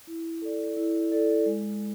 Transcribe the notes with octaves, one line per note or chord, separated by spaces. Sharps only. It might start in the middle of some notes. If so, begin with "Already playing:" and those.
E4
A4 D5
E4
A4 D5
G#3